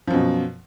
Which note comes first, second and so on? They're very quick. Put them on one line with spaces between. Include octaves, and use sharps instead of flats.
F3 F#2 B2